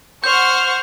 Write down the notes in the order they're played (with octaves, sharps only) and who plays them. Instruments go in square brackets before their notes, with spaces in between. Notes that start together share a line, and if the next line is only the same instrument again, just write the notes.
[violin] C5 F6 [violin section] F#5 C#6 [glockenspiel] G6